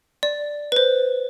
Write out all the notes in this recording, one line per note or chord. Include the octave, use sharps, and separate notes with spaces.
D5
B4 C5